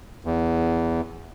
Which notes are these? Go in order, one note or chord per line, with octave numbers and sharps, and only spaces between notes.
E2